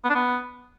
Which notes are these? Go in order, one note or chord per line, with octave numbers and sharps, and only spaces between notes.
B3
D4
B3